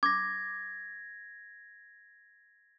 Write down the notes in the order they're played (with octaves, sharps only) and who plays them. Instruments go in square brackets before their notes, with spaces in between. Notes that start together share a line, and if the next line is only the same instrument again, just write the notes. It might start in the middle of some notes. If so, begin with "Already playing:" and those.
[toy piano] D6 [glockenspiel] G#6 A#6